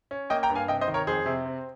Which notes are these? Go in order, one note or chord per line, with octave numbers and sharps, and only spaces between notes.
C#4
A#3 D#5 G5
G5 A#5
G2
F5 G#5
C3 D#5 G5
C5 D#5
D#3
A#4 C#5
F2 G#4 C5
C3
C4